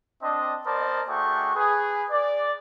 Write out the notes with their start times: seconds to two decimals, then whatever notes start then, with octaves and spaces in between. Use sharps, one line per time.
0.23 C4 D4 D#5
0.66 B3 A#4 C5 D5 D#5 A5
1.08 A3 D4 F#4 G#4 G5 C#6
1.55 G#4 B4
2.11 D5